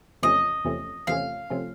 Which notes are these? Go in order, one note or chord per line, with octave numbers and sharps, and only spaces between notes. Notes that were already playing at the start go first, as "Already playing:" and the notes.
E2 C3 F3 A3 C#4 D#5
E2 C3 F3 A3 C#4
E2 C3 F3 A3 C#4 F5
C3 F3 A3 C#4